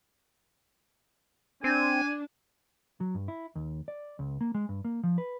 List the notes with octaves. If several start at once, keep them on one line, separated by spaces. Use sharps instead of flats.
C4 D4 G#5
F#3
G2
E4
D#2
D5
C#2
A#3
G#3
G2
A#3
F3
B4